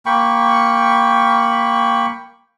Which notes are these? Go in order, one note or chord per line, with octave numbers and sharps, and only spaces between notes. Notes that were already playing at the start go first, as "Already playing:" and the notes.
A#3 G5 B5 C#6